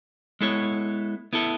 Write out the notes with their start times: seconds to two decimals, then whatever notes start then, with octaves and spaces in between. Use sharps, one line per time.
0.40 G#3 B3 E4 A4 C#5
1.33 B3 E4 A4